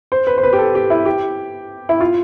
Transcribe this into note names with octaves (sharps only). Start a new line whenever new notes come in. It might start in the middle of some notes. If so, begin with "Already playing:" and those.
C5
B4
C5
B4
G4
A4
G4
E4
G4
E4
F4